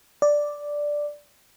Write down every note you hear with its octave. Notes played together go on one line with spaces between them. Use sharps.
D5